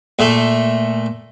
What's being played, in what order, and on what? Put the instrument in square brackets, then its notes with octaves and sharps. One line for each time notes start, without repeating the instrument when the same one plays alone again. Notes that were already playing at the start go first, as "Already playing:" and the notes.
[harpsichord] A#2 A3